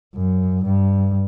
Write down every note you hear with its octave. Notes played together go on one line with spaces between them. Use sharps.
F#2
G2